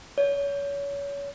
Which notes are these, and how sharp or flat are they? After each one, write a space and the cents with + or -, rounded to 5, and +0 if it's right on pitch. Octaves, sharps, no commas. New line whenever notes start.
C#5 +30